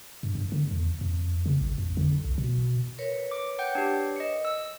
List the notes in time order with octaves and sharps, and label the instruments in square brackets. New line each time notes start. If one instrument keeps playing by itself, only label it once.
[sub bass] G2
G2
D3
E2
F2
C#3
G#1
F2
D3
B1
B2
[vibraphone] A#4 B4 C#5
[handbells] D6
F#5 G5 G6
D4 G4
D#5 C#7
E6